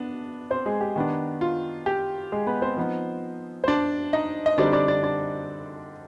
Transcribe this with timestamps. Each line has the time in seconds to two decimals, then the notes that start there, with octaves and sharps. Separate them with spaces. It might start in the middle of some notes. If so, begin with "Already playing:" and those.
Already playing: B3 D4
0.51 C4 C5
0.66 G#3 G#4
0.81 G4
0.96 D#3 B3 D4
1.41 F4
1.86 G4
2.32 G#3 G#4
2.47 B3 B4
2.62 C4 C5
2.77 F3 B3 D#4
3.64 C5
3.68 D4 D5
4.13 D#4 D#5
4.46 D#5
4.58 D3 G3 C4 D4 D#4 D5
4.73 D4 D5
4.88 D4 D5
5.03 D4 D5